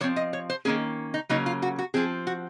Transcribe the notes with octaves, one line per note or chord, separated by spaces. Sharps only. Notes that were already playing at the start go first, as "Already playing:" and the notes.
F3 C4 C#5
D#5
C#5
C5
D#3 A#3 C#4 G#4
D#4
C#3 F#3 A#3 C#4 D#4
F4
F#4
F#4
F3 C4 G#4
F#4